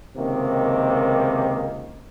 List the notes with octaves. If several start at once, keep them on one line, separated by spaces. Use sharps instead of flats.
C#2 C3 D#3 A#3